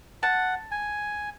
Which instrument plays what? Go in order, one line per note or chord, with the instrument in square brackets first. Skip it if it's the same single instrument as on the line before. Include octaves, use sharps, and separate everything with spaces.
[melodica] F#5 [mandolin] A5
[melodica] G#5